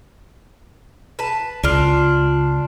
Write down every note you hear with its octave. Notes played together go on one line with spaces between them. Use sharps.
B4 A5
C#2 D4 F4